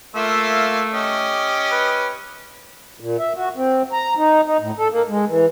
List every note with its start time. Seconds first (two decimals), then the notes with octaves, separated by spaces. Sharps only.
0.15 A3 A#3 F4 E5
0.93 C#4 G4 D#5
1.72 B4
3.00 A#2
3.19 E5
3.36 F#4
3.56 C4
3.93 A#5
4.17 D#4
4.45 D#4
4.60 A2
4.78 A4
4.91 A#3
5.09 G#3
5.28 E3